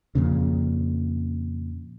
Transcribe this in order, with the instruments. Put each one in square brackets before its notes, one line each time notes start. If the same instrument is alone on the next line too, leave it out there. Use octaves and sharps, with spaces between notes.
[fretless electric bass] F2 A#2 C#3